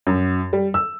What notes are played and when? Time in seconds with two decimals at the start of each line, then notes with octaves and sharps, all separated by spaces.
0.07 F#2
0.53 G3
0.74 E6